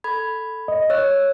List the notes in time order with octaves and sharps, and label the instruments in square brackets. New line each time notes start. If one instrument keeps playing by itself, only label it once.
[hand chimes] A4 B5 G#6
[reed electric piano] D#5
[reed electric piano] C#5 [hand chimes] E6 F#6